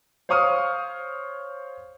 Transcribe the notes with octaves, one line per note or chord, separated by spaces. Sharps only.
C5 C#5 F5 C#6 D#6 F6